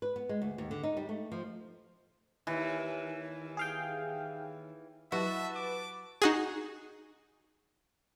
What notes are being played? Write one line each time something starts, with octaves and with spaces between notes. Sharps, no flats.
B4
B3
G#3
D2
D#2
D3
D#4
G3
A3
F3
D#2 E3
G#4 F5 G5
F#3 E4 F#4 G4 B4 E5 A5
D6
D#4 F#4 G#4